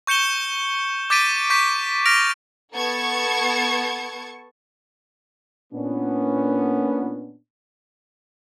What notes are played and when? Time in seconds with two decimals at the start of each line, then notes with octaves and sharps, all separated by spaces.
0.07 C#6 G6 C#7 E7 G7
1.10 D6 G6 A6 B6 D7 D#7
1.50 C#6 G6 B6
2.05 F6 A#6 D7 F7
2.76 B3 A4 A5 C#6 G#6 C#7
5.73 A#2 B3 C#4 D4